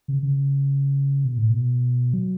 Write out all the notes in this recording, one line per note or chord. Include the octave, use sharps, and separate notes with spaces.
C#3
C#3
B2
A2
B2
F#3